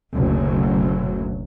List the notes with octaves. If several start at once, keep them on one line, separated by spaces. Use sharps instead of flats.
F#1 D2 B2 F#3